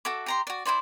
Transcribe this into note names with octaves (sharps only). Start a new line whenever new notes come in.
F#4 A4 E5 D6
G4 A#5 C6
F#4 D5
E4 F4 C5 D5